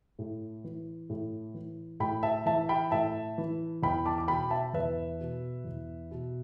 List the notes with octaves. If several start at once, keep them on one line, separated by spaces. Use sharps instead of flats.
A2
E3
A2
E3
A2 G5 B5
E5 A5
E3 E5 A5
G5 B5
A2 E5 A5
E3
E2 G5 B5
A5 D6
D6
B2 G5 B5
E5 A5
E2 B4 E5
B2
E2
B2